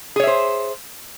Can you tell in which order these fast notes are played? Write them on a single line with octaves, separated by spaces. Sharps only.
G#4 C#5 E5 C5